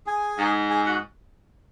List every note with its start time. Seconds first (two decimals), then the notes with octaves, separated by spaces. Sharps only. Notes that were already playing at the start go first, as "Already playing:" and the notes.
0.06 G#4 G#5
0.38 G#2
0.70 G#4 G#5
0.86 F#4 F#5